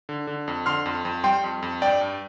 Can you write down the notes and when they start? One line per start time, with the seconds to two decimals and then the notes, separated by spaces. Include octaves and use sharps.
0.09 D3
0.27 D3
0.48 F2
0.66 D3 C6 F6
0.86 F2
1.05 F2
1.24 G3 G5 C6
1.44 F2
1.63 F2
1.82 G2 D5 G5
2.01 G2